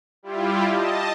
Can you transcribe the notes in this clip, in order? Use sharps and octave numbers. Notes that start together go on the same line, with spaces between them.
G3 E4 F4 G4
D#5 A5